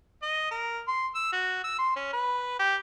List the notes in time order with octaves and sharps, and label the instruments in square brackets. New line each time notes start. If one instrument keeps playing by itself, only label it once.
[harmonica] D#5
A#4
C6
E6
F#4
E6
C6
C#4
B4
G4